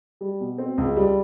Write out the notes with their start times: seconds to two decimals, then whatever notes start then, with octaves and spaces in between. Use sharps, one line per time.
0.21 G3
0.40 B2
0.58 C4
0.78 C#2
0.96 G3